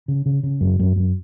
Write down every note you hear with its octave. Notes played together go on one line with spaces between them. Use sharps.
C#3
C#3
C#3
F#2
F#2
F#2